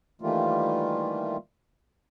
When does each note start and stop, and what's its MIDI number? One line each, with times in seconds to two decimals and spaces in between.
0.22 1.37 51
0.22 1.37 52
0.22 1.37 55
0.22 1.37 57
0.22 1.37 58
0.22 1.37 65